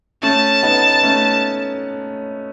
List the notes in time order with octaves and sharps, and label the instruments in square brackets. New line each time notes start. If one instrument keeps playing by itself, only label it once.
[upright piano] A3 C#4 [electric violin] A5
[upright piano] B3 D#4
A3 C#4